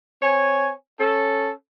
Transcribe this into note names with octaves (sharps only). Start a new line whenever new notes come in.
C4 C#5 G#5
C#4 A4